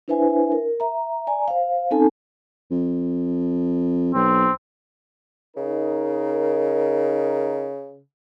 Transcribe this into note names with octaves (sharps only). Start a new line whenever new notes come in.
D4 E4 B4 C5 E5 G#5
A#4
E5 A#5
D5 G#5 A#5
C5 F5
C4 C#4 D#4 A4 G#5 A5
F2
B1 C4
C#3 D#4 A#4